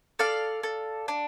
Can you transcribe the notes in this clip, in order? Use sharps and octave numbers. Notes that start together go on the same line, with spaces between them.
A4 D5 F5
A4
D4